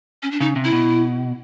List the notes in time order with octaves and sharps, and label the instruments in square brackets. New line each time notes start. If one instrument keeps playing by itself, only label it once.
[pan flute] C#4
D4
[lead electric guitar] C#3 [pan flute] D#4
[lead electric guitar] C3
[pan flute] E4
[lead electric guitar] B2